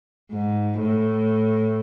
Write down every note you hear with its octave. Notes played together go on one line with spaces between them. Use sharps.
G#2
A2